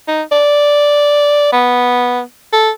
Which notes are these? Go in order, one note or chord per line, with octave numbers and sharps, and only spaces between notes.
D#4
D5
B3
A4